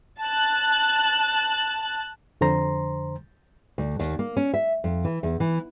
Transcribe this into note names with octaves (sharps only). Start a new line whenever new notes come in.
A5 F#6
F2 D3 C5 A#5 C6
D2
D#2
A#3
C#4
E5
F2
E3
E2
E3